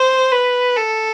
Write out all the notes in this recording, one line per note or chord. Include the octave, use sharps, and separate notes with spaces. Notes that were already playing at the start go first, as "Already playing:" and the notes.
Already playing: C5
B4
A4